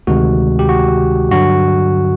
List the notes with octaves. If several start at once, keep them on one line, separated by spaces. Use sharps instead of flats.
D2 C3 D#3 G#3 F#4
G4
F#4
G2 D3 F#3 F#4